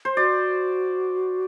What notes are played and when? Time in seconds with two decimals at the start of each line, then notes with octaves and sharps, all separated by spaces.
0.05 C5
0.16 F#4 D5